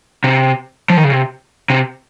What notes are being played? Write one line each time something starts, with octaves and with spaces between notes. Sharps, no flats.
C3
F3
D#3
C#3
C3
C3